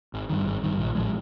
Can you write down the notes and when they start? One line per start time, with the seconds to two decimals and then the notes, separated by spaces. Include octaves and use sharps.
0.13 G#1
0.29 G2 D#3
0.46 G#1
0.63 G2 D#3
0.79 A#1
0.95 A2 F3 G#3